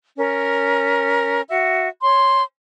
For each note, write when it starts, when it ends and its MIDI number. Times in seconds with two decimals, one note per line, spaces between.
0.17 1.41 61
0.17 1.41 70
1.49 1.88 66
1.49 1.88 76
2.02 2.44 73
2.02 2.44 84